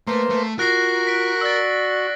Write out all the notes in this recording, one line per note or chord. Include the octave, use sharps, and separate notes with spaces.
A3 A#3 B4 C5
A3
F4 F#4 A#4 F#6 A#6 C7
B6 D7
D5 E6 A6